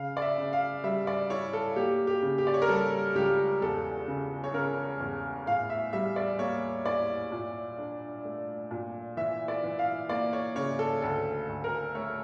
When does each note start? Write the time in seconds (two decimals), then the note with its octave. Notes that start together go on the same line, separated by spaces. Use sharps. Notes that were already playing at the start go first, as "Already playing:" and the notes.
Already playing: C#3 F5
0.17 D5
0.22 E5
0.38 C#3
0.53 F5
0.84 G3 E5
1.07 D5
1.30 E4 C#5
1.53 A4
1.76 A#3 G4
2.07 G4
2.22 C#3
2.38 G4
2.47 D5
2.54 C#5
2.62 A#4
2.69 G3 A4
3.15 C#2 G4
3.62 E2 A4
4.08 C#3
4.44 C#5
4.54 C#3 A#4
5.00 E2
5.47 A2 F5
5.70 E5
5.93 G3 E5
6.16 D5
6.39 A#3 C#5
6.85 E4 D5
7.32 A#2
7.78 D4
8.25 A3
8.71 A#2
9.17 E3 E5
9.48 D5
9.64 E3
9.79 F5
10.09 A#3 D5
10.33 C#5
10.56 C#3 C#5
10.79 A4
11.02 D2 A4
11.48 D2
11.64 A#4
11.95 A3 C#5